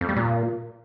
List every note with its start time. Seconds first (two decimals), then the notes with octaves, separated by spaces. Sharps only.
0.01 F2
0.09 G3
0.16 A#2